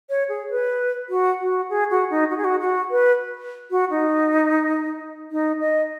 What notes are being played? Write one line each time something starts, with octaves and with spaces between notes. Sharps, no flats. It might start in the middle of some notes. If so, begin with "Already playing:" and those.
C#5
G#4
B4
F#4
F#4
G#4
F#4
D#4
F#4
G#4
F#4
F#4
B4
F#4
D#4
D#4
D#5